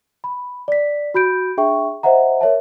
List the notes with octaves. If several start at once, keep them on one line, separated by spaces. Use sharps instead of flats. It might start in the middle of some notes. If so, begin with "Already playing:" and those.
B5
D5 B6
F#4 B5 G6 D7
D4 G#4 E5 G5 C#6
C5 D#5 E5 F#5 A#5
A#4 C#5 E5 A5